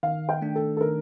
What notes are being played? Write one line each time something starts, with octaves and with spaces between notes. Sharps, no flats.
D#3 F5
G5
A3 D4
A4
A4
D#3 A#4